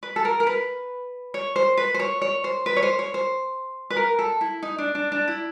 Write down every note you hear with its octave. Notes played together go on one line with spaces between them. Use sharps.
B4
A4
A#4
A#4
B4
C#5
C5
B4
C5
C#5
C#5
C5
B4
C#5
C5
C#5
C5
B4
A#4
A4
E4
D#4
D4
D4
D4
E4